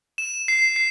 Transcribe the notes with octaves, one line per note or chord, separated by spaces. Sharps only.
E7
C7
C7